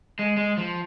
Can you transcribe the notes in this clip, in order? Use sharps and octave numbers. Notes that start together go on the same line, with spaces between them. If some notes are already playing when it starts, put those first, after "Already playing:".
G#3
G#3
F3